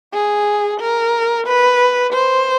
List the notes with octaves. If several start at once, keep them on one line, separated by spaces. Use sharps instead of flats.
G#4
A#4
B4
C5